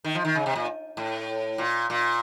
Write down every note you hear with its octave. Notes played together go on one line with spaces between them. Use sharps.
D#3
F3
D#3
C#3
C3
A#2
A2
A#2
A#2